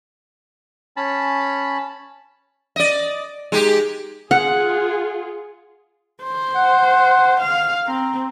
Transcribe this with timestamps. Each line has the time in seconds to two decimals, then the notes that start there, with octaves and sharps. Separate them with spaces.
0.97 C#4 A5 B5
2.76 D5 D#5
3.52 G#3 D#4 G4
4.31 F4 G#4 F#5
6.23 C5
6.55 F#5
7.40 F5
7.86 C4 A#5